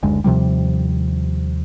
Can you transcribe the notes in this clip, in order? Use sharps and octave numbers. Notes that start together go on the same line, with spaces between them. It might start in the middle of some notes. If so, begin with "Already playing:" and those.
F#1 D2 G#3
D#2 C3 F3 G3